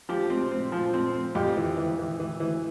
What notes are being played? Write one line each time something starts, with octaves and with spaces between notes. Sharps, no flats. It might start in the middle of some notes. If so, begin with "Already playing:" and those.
F3 G4
C4
C4
F3
C4
C4
F2 G4
E3
E3
E3
E3
E3